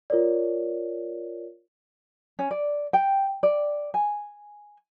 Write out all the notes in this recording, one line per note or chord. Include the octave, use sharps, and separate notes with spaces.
F4 A#4 C#5 D5
C#4
D5
G5
D5
G#5